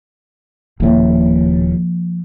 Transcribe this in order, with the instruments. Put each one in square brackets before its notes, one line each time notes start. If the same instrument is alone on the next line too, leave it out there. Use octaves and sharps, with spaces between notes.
[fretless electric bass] D#1 A2 [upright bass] F3 A#3